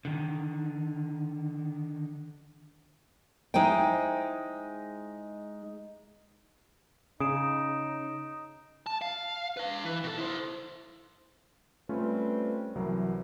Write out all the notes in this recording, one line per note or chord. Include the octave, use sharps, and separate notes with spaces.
D3 D#3
G#3 D#4 E4 C5 G5
C#3 D#4 D#6 D7 E7
A5
F5
B4 F5
E3
B2 A4
E4 C5
G3 A3 C4 C#4 F4 B4
C2 E3 F#3 A#4